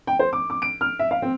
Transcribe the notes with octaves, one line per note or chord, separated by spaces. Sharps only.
G5
C5
D6
D6
D7
F6
E5
F5
C4